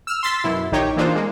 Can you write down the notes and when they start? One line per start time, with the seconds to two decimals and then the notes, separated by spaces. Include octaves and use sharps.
0.07 E6 F6
0.23 C6 E6 A6 B6
0.44 F#2 B2 E4
0.72 A#1 D#3 D#4 G4 C#5
0.96 E3 A#3 D4 D#4 F4 C5
1.15 G#3 A#3